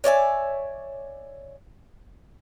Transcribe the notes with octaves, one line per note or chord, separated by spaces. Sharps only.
C#5 D5 E5 G#5